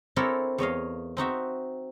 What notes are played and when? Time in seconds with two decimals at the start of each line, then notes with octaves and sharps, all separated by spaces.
0.16 C4 D4 E4 A4 A#4 C#5
0.58 E2 C#5 D#5 F5
1.17 C4 D#4 F#4 E5